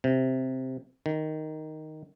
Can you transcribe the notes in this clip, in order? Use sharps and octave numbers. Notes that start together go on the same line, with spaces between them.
C3
D#3